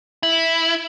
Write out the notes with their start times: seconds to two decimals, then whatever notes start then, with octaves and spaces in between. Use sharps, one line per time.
0.23 E4